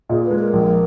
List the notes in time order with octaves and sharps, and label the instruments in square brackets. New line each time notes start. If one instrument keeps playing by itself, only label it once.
[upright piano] A#2 [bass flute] G#4
[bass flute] B4
[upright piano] G#3
[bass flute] A#4
[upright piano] A#1